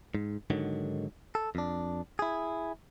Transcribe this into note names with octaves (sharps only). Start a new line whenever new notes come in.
G#2
G#2 D3 D#3 F#3
A4
F2 D4
E4 G#4